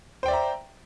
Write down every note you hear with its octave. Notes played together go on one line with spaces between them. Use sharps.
C5 D5 E5 G5 A#5